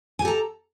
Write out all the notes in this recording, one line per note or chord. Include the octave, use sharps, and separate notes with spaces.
G4 A4 G#5 A#5